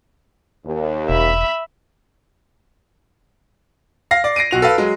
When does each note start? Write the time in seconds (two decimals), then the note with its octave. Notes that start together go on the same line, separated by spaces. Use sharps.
0.65 D#2
1.09 E1 E5 B5
4.11 F5 A#6 C7
4.24 D5
4.36 A#6 C7 D7 D#7
4.51 B1 F#4 F7
4.62 A4 B4 F5
4.78 F#3 G#3